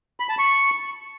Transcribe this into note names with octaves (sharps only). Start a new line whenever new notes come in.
B5
A5
C#6